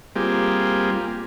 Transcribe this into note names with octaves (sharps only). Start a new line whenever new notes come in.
G3 A#3 C4 F4 G4 G#4